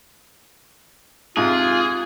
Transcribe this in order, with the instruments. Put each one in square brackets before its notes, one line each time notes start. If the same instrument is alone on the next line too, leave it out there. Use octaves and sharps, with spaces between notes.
[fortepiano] G#2 C3 [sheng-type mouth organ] F4 [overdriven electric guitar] G#4